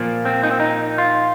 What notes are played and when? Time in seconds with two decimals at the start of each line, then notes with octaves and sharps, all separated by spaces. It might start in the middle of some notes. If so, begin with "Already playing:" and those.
Already playing: A#2 F3 A#3
0.25 C4
0.43 D#4
0.51 C4
0.60 D#4
0.98 F4